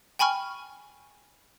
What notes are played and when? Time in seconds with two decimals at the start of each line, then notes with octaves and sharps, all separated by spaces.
0.19 G5 G#5 B5 C#6 F6